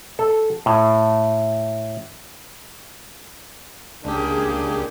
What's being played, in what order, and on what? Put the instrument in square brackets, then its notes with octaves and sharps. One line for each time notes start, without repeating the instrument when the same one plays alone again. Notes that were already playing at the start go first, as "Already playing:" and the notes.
[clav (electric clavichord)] A4
A2
[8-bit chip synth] C#2 G4 [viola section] A#3 G#4 [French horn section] D4